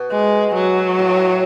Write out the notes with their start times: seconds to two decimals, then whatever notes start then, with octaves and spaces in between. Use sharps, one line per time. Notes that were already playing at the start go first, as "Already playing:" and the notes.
Already playing: B2
0.11 G#3
0.55 F#3
0.99 A2